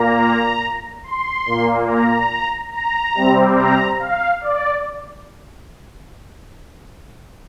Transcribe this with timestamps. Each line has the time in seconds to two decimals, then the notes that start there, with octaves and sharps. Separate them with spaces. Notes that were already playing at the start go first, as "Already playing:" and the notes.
Already playing: A#2 A#3 A#5
1.03 C6
1.46 A#2 A#3
1.87 A#5
2.72 A#5
3.14 C3 G3 C4
3.56 A#5
3.99 F5
4.41 D5